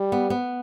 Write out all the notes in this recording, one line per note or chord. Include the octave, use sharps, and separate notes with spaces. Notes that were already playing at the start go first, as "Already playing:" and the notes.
Already playing: G3
B3
B3